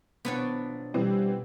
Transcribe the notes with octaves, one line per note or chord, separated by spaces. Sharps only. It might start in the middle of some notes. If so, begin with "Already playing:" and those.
B1 F3 B3 D4 E4 C#5
B2 E3 G3 C4